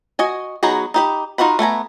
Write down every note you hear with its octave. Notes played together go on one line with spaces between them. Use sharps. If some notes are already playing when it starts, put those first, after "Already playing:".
F#4 D#5 G#5
F#3 B3 D#4 F#4 G#4
D#4 G4 B5
D#4 F4 F#4 F#5 B5
A3 B3 G#5 A#5